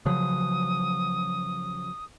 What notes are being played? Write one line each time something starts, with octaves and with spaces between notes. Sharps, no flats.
C#3 F3 F#3 D#6